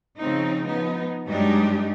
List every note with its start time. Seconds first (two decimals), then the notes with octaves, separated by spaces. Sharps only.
0.18 C#3 F3 C4 D#4
0.65 F3 B3 D#4
1.26 G2 F#3 G#3 D4 D#4 G4